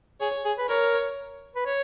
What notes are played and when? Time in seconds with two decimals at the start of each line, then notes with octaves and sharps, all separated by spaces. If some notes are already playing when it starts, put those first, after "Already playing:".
0.20 G#4 C#5
0.45 G#4
0.58 B4
0.68 A#4 C#5
1.56 B4
1.66 C#5